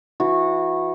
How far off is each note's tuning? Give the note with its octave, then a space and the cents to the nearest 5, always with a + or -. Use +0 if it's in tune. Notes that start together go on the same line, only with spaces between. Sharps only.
E3 +0 F#4 -20